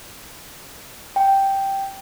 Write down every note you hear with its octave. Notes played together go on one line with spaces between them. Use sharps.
G5